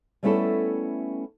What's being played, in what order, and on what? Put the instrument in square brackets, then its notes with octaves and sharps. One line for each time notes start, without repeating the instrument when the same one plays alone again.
[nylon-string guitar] G3 A3 B3 C#4 E4 A4